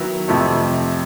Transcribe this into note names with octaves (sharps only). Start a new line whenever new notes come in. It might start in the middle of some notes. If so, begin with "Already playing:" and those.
Already playing: D#3 F#3 B3 E4
F2 C3 F3 A3